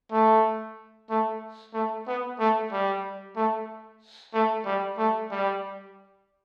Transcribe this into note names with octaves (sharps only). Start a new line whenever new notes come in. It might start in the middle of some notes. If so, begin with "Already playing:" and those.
A3
A3
A3
B3
A3
G3
A3
A3
G3
A3
G3